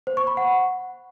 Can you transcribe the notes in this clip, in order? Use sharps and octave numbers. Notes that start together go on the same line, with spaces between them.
C5
C#6
B5
F#5